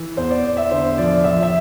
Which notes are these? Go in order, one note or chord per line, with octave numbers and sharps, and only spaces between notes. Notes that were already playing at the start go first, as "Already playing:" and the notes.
Already playing: E3
E2 C5
D5
E2
E5
D3 C5
F3 D5
F3 E5
E5